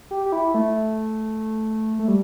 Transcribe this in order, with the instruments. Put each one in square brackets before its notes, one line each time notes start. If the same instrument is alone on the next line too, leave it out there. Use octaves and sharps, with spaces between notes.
[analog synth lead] G4
G4
E4
A3
A3
G3